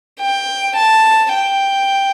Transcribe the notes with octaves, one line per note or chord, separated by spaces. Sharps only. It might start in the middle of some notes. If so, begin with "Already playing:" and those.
G5
A5
G5